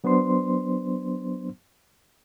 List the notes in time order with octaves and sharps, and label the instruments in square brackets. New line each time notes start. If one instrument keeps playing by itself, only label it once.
[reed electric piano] F#3 B3 D4 C5 C6